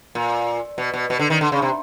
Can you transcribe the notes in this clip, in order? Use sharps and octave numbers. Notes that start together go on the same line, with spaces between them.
A#2
B2
B2
B2
D3
D#3
D3
C#3
C3